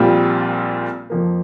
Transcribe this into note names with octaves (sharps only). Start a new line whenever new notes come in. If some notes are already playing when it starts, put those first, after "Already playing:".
Already playing: A#1 A#2 G3 C4 F4
F2 F3 A#3